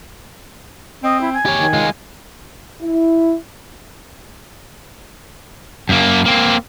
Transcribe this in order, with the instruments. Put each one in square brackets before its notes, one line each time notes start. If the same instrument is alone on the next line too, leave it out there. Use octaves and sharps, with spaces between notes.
[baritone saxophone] C4 [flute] D#5
[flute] E4
G#5
[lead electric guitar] G4 C#5
[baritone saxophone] D#3
[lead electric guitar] G#3 F4
[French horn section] E4
[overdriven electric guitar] F#2 A#3
A#3 C4